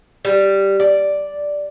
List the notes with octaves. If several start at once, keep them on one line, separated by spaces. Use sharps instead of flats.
G3
D5